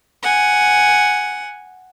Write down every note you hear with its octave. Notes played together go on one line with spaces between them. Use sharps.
F#5 G#5